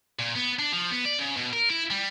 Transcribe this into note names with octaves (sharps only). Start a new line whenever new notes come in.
A#2
B3
D4
F3
B3
D5
C#3
B2
A#4
E4
G3